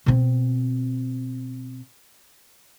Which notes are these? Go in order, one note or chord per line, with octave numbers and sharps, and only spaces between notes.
B2 C4